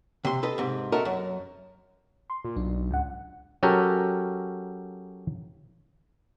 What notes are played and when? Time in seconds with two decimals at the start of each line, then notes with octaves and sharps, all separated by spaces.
0.25 C3 C6
0.43 A4 B4 D#5
0.58 G#2 C3
0.92 F#4 A4 A#4 D#5 E5
1.05 F#2
2.30 C6
2.45 A#2
2.56 B1 D4
2.91 C#2 G#2 F#5
3.63 F#3 C#4 F#4 G4 A4 A#4